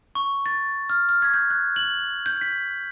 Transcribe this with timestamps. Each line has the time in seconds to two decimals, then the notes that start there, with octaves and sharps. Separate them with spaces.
0.15 C#6
0.46 A6
0.90 F6
1.09 F6
1.22 G#6
1.34 G6
1.50 F#6
1.76 F#7
2.26 G6
2.41 B6